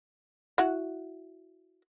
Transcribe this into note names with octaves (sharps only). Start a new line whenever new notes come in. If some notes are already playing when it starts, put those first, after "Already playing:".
E4 F#4 F#5